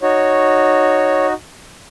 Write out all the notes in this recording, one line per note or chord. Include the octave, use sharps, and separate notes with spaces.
D#4 F#4 C#5